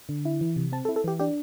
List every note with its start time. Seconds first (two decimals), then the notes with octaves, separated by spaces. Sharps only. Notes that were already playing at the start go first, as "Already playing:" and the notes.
0.09 D3
0.25 E4
0.41 E3
0.56 C3
0.72 C4 A5
0.85 A4
0.89 E4
0.96 A4
1.04 E3 G4
1.19 D4 G4